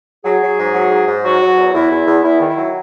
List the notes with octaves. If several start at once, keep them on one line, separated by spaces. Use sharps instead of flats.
F#3 G#4
F#3
G#2
F#3
G#2
G#2
F#3 F#4
F#3
E2
E2 E4
E2
E2
E2 E4
D#3
E4
F#3